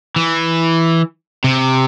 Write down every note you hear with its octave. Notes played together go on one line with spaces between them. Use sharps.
E3
C3